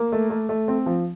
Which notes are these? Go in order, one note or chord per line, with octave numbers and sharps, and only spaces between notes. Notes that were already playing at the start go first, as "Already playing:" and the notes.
Already playing: A#3
A3
A3
A3
C4
F3